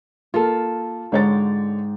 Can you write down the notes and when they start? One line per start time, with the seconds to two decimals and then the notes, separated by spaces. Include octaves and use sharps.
0.34 A#3 F4 A4
1.12 G#2 D3 C#5 G5 D6 A6